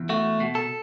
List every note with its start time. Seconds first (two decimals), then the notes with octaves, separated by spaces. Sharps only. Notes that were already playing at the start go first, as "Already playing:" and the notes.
Already playing: E2
0.09 A3 F#4
0.40 B2
0.55 A4